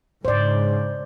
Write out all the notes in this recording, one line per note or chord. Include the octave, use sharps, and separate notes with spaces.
G#2 C#3 C5 D5